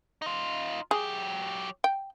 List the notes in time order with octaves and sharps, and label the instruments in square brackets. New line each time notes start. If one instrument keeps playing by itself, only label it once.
[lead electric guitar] D#4 F4
[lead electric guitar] F#3 G4 [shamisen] G#4
[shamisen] G5